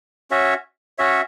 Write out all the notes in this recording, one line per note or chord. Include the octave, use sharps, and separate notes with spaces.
C#4 F#4 C#5 E5
C#4 F#4 C#5 E5